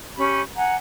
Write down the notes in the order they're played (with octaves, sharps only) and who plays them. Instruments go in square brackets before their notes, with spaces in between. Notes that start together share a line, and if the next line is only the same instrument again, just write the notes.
[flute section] C#4 G4 B5
F#5 G#5 A#5